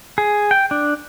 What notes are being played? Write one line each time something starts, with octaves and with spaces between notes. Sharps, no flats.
G#4
G5
D4